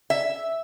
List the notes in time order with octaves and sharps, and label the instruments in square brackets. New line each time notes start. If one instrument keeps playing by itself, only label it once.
[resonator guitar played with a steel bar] E5